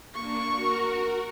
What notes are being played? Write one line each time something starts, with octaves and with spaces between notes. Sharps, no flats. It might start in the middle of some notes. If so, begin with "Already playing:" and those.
A#3 D4 C#6
F#4 A#4